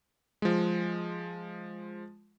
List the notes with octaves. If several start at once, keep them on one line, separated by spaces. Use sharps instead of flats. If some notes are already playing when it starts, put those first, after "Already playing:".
F3 G#3